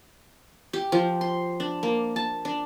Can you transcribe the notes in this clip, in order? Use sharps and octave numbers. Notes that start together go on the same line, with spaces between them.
G4
F3
C6
D4
A#3
A5
D4